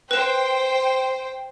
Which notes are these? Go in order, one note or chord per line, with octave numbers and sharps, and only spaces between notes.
B4 C5 G5 E7